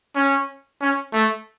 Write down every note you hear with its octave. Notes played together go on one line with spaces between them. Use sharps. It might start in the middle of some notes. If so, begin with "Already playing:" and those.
C#4
C#4
A3